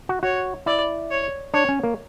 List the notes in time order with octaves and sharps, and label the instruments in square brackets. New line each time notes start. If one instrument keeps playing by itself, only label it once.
[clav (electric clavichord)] F#4
[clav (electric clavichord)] F#4 [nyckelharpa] C#5
[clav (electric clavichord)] E4 [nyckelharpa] D5
[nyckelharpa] C#5
[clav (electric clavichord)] D4 [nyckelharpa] C#5
[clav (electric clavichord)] C#4
A#3